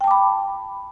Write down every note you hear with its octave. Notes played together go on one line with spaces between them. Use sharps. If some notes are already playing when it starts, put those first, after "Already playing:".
G5 A5 B5 D6